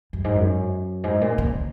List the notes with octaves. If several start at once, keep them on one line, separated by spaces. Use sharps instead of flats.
F#2
G#2
F#2
G#2
A#2
C#3